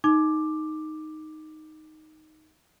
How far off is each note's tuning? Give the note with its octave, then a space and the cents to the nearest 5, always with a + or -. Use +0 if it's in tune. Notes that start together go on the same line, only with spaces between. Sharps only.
D#4 +0 D6 +10